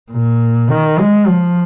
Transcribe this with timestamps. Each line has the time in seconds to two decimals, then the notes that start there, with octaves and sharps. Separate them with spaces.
0.12 A#2
0.70 D#3
0.99 G#3
1.28 F3